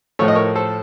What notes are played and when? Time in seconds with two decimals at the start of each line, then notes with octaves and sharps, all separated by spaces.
0.19 A2 F3 A3 C#5
0.28 D#5
0.35 A#4 C#5
0.55 A4 C5